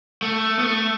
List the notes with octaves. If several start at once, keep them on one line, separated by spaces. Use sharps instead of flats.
A3
B3
A3